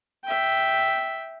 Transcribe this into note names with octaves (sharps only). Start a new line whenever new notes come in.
E5 G5